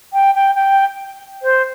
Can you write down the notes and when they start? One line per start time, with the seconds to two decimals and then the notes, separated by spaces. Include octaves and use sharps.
0.13 G5
0.34 G5
0.55 G5
1.42 C5